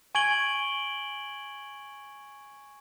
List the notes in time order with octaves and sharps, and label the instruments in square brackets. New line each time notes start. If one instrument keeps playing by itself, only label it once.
[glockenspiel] G#5 C#6 G#6 D7 F#7 G7